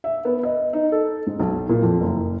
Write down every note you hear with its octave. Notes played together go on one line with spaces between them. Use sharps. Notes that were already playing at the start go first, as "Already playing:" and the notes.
E5
B3
D#5
D#4
A4
G#2
B1
A#2
F2
F#1